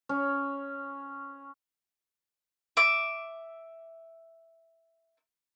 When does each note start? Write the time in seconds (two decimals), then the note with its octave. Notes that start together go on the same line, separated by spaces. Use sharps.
0.09 C#4
2.77 E5 D6